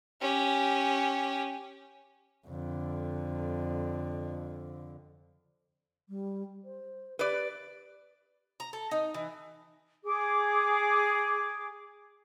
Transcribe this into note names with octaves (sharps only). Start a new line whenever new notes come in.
C#4 G4
F2 D3
G3
C5
G4 B4 D5
A#5
A4
D#4
E3
G#4 D6